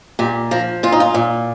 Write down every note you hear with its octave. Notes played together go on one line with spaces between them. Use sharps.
A#2 G4
F3 A#4
A#2 F4
D#4
F4
A#2